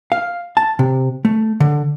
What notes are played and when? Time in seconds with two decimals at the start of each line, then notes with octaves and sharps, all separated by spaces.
0.12 F5
0.57 A5
0.79 C3
1.25 A3
1.60 D3